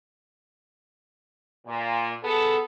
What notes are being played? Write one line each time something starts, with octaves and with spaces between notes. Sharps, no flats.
A#2
B3 G#4 A4